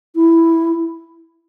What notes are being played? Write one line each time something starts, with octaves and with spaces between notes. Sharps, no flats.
E4